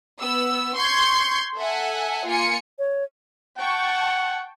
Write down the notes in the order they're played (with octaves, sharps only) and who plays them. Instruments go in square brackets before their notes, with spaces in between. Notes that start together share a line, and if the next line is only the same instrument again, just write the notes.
[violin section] B3 E6
C6 C#6 G6 G#6
A4 E5 F#5 G#5
A#3 F4 G#5 C#7
[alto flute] C#5
[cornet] F#5 [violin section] G5 A5 C#6